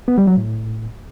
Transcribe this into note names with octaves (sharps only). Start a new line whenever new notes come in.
B3
G3
F#3
A2